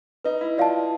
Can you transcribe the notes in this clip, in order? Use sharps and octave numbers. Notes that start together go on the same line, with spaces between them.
D#4 B4
E4
F4 D5 F5 A5